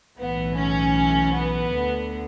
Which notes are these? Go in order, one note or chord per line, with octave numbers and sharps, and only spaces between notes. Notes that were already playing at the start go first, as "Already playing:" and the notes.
B1 A2 E3 B3
C#4
B3
D2 D3